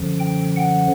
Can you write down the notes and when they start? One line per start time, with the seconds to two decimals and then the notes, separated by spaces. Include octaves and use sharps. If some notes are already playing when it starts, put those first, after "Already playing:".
Already playing: F#2 D3 F3
0.19 G5
0.56 F#5